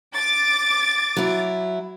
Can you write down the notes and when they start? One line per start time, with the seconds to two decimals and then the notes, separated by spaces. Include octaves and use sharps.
0.15 D6 A6
1.17 F#3 E4